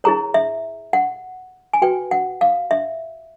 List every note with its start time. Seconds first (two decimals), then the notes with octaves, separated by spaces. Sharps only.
0.04 E4 G#4 C#5 A#5
0.34 E5
0.93 F#5
1.73 G#5
1.82 F#4 B4 G5
2.11 F#5
2.41 F5
2.71 E5